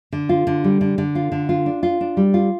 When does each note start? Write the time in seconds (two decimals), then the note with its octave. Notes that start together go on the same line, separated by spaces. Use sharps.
0.12 D3
0.29 F4
0.47 D3
0.64 G3
0.81 D3
0.98 D3
1.15 F4
1.32 D3
1.49 F4
1.66 D4
1.83 F4
2.01 D4
2.17 G3
2.34 F4